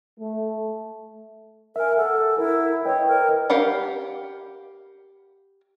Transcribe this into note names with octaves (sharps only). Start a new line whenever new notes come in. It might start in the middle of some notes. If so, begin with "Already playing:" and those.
A3
A#4 E5 G#5
A4 F#5
E4 A#4
B4 C#5 D#5 G5
A#4
G4 A#4 F5 F#5 B5